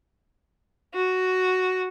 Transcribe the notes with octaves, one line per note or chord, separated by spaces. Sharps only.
F#4